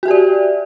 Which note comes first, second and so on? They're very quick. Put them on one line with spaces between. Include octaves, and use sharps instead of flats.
F#4 E5 G4 D5